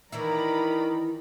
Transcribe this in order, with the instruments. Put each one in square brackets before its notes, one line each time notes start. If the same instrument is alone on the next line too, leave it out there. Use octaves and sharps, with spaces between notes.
[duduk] D#3 [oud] E3 E4 E5 [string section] D5 A#5 B5